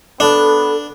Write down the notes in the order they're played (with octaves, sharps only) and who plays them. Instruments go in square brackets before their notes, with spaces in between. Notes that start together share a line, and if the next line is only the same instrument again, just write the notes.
[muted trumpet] B3 [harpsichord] D4 [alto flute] A4